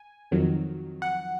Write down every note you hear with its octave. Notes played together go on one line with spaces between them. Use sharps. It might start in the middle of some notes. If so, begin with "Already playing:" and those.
Already playing: G#5
F2 D#3 F#3
F#5